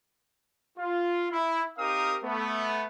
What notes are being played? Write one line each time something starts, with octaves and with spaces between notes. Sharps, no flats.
F4
E4
C4 D#4 G4 A#4 F5 D#6
A3 B3